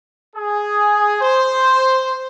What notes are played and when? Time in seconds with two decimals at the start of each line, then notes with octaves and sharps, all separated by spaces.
0.34 G#4
1.20 C5